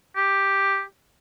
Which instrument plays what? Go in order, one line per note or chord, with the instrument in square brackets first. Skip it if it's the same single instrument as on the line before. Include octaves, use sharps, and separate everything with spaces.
[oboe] G4